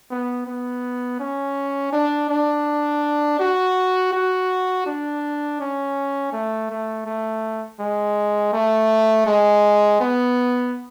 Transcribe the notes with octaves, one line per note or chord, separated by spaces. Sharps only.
B3
B3
C#4
D4
D4
F#4
F#4
D4
C#4
A3
A3
A3
G#3
A3
G#3
B3